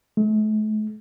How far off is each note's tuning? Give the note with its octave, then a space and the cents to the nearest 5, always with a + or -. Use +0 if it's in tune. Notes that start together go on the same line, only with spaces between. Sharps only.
A3 -40